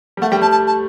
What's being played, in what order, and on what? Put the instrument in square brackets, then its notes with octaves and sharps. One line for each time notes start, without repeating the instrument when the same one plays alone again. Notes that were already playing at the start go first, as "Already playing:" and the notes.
[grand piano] G3
[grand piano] A3 [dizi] F#5
[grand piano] G3 [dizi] G5
[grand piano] G3 [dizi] A5
[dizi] A5
A5